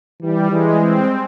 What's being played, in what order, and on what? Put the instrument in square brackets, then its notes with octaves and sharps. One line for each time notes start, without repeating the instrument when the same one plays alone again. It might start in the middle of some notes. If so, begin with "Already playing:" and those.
[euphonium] E3 [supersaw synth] G3
[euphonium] E3 [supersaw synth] G#3
[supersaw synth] C4